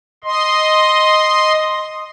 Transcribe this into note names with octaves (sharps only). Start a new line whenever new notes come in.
D#5 C6